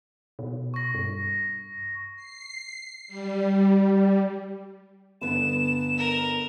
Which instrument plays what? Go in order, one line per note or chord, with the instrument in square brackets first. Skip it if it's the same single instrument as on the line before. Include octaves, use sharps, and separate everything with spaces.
[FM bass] B2
[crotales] C#6 A#6
[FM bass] G2
[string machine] C7
G3
G3
[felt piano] G1 B3 [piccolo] E7
[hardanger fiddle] A#4